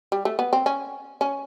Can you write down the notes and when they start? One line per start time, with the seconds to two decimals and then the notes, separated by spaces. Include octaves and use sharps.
0.12 G3
0.25 A3
0.39 B3
0.53 C4
0.66 C#4
1.21 C#4